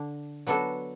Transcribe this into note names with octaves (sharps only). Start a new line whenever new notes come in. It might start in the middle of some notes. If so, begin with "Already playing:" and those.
Already playing: D3 D4
F#3 B3 D4 F#4 A4